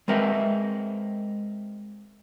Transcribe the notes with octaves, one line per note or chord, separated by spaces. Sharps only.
G#3 C4 A#4 B4 E5